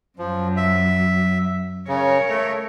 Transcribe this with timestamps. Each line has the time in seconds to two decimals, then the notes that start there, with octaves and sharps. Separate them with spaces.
0.19 F#2 F3 F#3
0.57 E5
1.88 C#3 A#4 C#5
2.29 A3